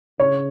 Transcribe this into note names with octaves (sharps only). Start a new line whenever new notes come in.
C#3 C#5